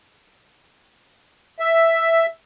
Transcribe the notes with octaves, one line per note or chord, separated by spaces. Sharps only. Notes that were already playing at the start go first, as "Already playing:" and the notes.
E5